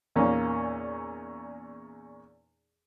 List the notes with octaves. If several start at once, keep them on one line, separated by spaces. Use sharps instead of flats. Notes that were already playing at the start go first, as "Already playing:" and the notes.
E2 A#2 A#3 C#4 D#4